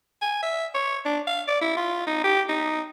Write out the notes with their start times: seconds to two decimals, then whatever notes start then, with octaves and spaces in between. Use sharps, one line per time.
0.21 G#5
0.43 E5
0.75 C#5
1.05 D4
1.27 F5
1.48 D5
1.62 E4
1.77 F4
2.07 D#4
2.24 G4
2.49 D#4